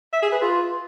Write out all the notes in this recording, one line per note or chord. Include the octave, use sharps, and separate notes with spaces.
E5
G#4
B4
F4